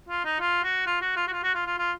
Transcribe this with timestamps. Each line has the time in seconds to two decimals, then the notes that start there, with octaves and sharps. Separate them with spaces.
0.09 F4
0.25 D#4
0.40 F4
0.63 F#4
0.86 F4
1.01 F#4
1.16 F4
1.28 F#4
1.32 F4
1.43 F#4
1.54 F4
1.66 F4
1.78 F4